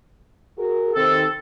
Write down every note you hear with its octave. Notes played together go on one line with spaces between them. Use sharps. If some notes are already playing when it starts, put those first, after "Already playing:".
F#4 G#4 A#4
C3 D#3 C4 A4